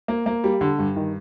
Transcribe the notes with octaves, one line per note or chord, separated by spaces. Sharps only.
A#3
A#3
G3
D3
G2
D#3